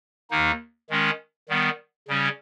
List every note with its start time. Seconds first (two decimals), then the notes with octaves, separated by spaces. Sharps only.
0.30 D#2 D#3 A#3 D#4
0.90 D#3 G#3 C#4
1.49 D#3 G3 B3
2.08 C#3 G3 C#4